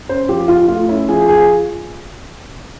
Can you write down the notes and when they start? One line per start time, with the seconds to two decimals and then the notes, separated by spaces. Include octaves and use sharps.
0.09 C#4 C5
0.29 F3 G4
0.48 F3 F4
0.68 A3 F4
0.88 C#4 E4
1.09 F3 G#4
1.29 F3 G#4